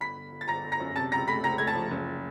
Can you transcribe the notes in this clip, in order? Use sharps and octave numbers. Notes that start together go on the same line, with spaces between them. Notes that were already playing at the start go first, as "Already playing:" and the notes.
G1 B5 B6
G1
G1
A6
G1 A#5 A#6
G1
A#5 A#6
F#2
C3 A5 A6
C#2 A#5 A#6
A3 B5 B6
C#2 A#5 A#6
A3 G#6
A5 A6
F3
F#1